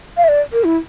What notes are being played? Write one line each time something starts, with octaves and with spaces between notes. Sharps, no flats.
F5
E5
D5
A#4
E4